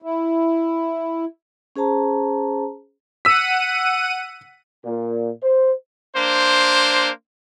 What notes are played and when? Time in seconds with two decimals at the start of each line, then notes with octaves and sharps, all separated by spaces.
0.02 E4
1.76 C#4 G#4 C5 A5 A#5
3.25 F#5 E6 B6 D#7
4.85 A#2
5.41 C5
6.16 A#3 D4 C5